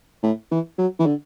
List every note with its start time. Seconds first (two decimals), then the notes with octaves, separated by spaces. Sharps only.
0.23 A2
0.51 E3
0.78 F#3
0.99 E3
1.06 D3